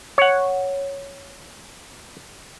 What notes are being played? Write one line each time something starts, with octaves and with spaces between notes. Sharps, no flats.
C#5 F#5